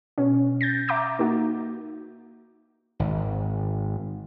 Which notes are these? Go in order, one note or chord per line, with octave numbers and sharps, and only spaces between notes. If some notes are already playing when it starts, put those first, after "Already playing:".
B2 C#4
G6 A6 A#6
E5 A#5 D6 G6
A#3 D#4 F#4
G#1